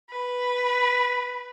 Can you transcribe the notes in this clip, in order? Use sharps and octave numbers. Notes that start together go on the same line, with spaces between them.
B4